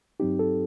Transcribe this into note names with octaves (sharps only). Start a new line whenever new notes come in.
G2 F#3 C4 D#4 G4
A4